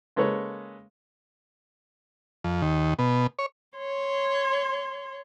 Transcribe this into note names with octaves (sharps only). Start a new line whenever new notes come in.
C#3 G#3 A#3 A4 B4 C#5
F2
D#2
B2
C#5
C#5 C6